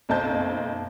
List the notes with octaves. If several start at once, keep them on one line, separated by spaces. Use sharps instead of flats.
F#1 B1 C4 A5 G6